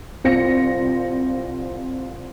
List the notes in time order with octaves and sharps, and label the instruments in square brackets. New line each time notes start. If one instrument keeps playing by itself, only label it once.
[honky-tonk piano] C2 C4 F4 A#6 C#7